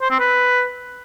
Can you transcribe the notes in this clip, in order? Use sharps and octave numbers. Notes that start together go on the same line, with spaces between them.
C5
C4
B4